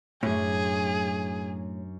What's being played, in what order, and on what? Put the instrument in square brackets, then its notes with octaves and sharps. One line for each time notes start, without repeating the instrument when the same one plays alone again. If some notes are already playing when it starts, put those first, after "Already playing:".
[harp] F#2 C#4 D4 [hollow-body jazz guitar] A2 [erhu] G#4